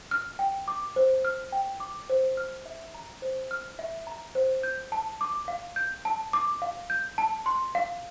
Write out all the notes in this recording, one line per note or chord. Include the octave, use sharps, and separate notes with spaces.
F6
G5
D6
C5
F6
G5
D6
C5
F6
E5
A#5
C5
F6
E5
A#5
C5
G6
A5
D6
F5
G6
A5
D6
F5
G6
A5
C6
F5